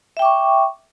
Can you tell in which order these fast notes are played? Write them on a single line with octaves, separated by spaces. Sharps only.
E5 G5 D6 C#6